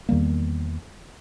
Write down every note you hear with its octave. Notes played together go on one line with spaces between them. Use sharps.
E2 D#3 G3 A#3